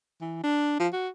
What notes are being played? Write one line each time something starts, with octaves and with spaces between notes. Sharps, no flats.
E3
D4
F3
F#4